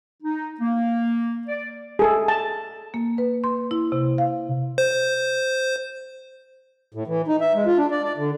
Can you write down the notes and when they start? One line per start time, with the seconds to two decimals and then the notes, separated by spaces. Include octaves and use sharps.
0.23 D#4
0.61 A#3
1.48 D5
1.99 G#4 A4
2.28 A5
2.94 A#3
3.18 B4
3.44 C6
3.71 E4
3.92 C3
4.18 F5
4.78 C5
6.94 A2
7.07 E3
7.28 D#4
7.41 E5
7.54 G#3
7.66 F4
7.78 D4
7.91 D5
8.04 D5
8.17 D3